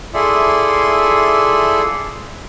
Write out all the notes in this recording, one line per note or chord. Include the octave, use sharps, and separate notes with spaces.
E4 F4 G#4 A4 D5 E5